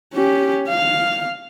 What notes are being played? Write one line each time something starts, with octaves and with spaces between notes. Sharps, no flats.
C#4 G4
F5